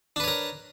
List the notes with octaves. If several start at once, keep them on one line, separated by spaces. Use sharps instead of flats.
D4 A#4 B4 C#5